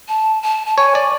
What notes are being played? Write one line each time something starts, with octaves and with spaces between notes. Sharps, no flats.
A5
A5
A5
C#5 G#5
D5